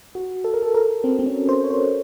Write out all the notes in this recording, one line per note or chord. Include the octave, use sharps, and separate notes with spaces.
F#4
A4
A#4
A4
A#4
C4
C4
C#4
C5
C#5
C5